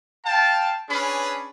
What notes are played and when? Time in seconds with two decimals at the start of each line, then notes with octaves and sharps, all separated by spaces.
0.25 F5 G5 A5
0.89 C#4 D4 G#4 B4 B5